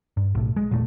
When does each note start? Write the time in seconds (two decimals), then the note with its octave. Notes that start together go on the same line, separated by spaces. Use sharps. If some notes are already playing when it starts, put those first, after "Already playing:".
0.17 G2
0.35 B1 A2
0.56 G#3
0.71 E1 A#2 A3